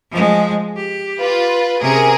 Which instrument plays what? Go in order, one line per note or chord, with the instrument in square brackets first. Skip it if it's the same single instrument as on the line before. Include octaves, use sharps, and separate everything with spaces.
[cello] F3 G#3
G4
[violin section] F4 B4
[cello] C3 C#4 [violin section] G#4 A#4 G#5